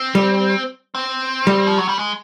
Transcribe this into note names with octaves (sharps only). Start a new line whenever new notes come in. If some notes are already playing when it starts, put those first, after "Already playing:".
Already playing: C4
G3
C4
G3
F3
F#3
G3
G#3